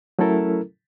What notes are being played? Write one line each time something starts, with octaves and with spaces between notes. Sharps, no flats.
F#3 A3 C#4 E4 A4 A#4